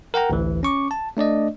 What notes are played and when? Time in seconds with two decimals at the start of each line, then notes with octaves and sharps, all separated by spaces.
0.14 A#4 F#5 G5 A#5
0.30 A1 D2 E3
0.63 C#4 C#6 D6
0.91 A5
1.17 A3 D4 D5 D#5